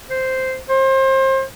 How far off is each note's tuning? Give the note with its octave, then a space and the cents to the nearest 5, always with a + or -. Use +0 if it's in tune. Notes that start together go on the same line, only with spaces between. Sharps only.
C5 -5
C5 +30